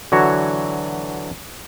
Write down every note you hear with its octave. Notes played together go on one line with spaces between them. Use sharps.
D3 E3 F#3 F#4 C#5